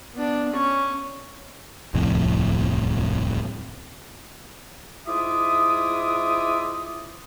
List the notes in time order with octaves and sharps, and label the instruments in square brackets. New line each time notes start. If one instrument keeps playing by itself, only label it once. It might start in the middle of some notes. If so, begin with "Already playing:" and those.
[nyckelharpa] B3 D4
C#4 C#6
[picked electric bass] D1 C2 F2 A2
[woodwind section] G#2 E4 F4 E5 D6 D#6